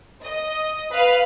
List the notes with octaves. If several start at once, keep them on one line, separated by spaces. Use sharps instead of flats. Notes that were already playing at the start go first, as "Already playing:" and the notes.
D#5
B4 F5